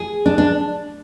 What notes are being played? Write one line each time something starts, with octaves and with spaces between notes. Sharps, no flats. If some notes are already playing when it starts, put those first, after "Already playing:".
Already playing: G#4
D4
D4